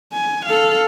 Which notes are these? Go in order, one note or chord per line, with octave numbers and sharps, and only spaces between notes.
G#5
A4 F5